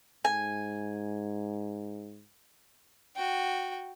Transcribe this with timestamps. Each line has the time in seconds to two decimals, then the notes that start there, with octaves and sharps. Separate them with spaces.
0.25 G#2 G#5
3.16 F#4 G5